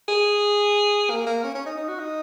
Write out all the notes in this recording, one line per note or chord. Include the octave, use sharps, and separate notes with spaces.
G#4
A#3
A#3
C#4
C#4
D#4
D#4
F#4
D#4